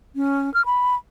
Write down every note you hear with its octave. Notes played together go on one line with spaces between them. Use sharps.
C#4
F6
B5